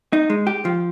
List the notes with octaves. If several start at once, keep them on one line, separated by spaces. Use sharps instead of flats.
D#4
G#3
G4
F3